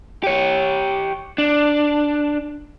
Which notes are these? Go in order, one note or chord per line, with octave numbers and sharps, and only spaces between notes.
G4 C#5
D4